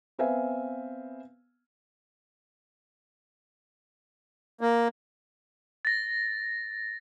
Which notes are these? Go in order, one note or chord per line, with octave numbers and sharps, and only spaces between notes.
B3 C4 B4 E5 F5 G#5
A#3
A6 A#6